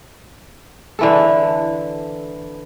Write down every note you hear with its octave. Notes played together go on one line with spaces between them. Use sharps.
D3 E3 A4